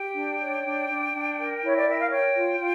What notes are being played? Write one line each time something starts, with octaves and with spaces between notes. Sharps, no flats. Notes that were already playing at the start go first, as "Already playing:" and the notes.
Already playing: G4 G5
D4
C#5
D4
D4
D4
A#4
E4 C#5
D5
A#4 E5
F5
C#5 G5
F4
F4